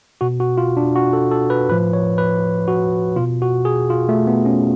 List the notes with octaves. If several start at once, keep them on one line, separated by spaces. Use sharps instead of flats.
B2 F#4
F#4
F4
D4
F#4
A4
A4
B4
A2 F3 B4
C#5
B4
F#4
B2 F4
F#4
G#4
F4
A3
B3
C#4